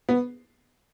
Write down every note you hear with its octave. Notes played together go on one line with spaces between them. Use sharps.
B3